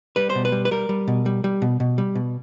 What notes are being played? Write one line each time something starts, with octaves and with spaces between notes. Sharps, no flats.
G3 B4
C5
B2
B4
G3
B4
G3 A#4
G3
B2
G3
G3
B2
B2
G3
B2